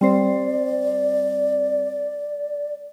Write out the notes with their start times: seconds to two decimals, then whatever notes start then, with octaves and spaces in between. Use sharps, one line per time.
0.01 G3 C4 C5 D5